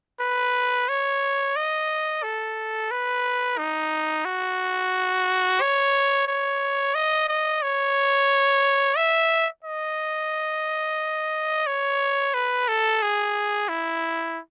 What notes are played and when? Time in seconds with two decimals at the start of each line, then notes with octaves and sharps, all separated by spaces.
0.20 B4
0.89 C#5
1.56 D#5
2.23 A4
2.91 B4
3.58 D#4
4.25 F#4
5.61 C#5
6.27 C#5
6.95 D#5
7.29 D#5
7.62 C#5
8.97 E5
9.64 D#5
11.66 C#5
12.34 B4
12.68 A4
13.02 G#4
13.69 E4